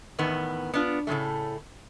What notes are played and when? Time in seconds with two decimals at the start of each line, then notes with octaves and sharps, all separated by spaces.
0.19 E2 A2 D#3 B3
0.74 B3 D4 F4
1.07 A2 C#3 G#3 A3